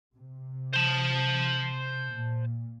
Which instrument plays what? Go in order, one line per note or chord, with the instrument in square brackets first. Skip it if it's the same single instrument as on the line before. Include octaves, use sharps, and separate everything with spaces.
[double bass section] C3
[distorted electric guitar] C5 A5
[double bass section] A#2